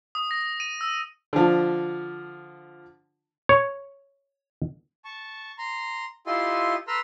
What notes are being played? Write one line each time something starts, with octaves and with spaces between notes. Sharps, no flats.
D#6
A#6
D#7
E6
D3 F3
C#5
A5 C#6
A#5 C6
E4 F4 G4 A4 D#5 C6
A4 B4 A#5 C6 E6 F6